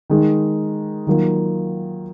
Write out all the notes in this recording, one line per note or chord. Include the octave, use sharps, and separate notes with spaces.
D#3 G#3 D#4
D#3 F#3 A#3 F4